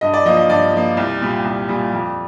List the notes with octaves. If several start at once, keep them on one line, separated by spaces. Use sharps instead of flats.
G2 D#5
D5
F3 A#3 D#5
D#5
G2 D5
F3 A#3
C2
A#2 G3
C2
A#2 G3
F2